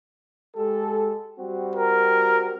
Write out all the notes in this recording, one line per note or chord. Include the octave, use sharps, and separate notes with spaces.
G#3 G4 A4
G3 C4 F#4
A#4